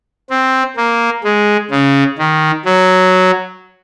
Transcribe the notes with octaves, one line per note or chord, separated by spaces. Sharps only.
C4
A#3
G#3
C#3
D#3
F#3